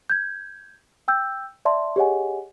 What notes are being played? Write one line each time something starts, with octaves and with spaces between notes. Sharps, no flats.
G6 G#6
G5 E6 G6
D5 E5 A5 C6
G4 G#4 C#5 D#5 F#5 G#5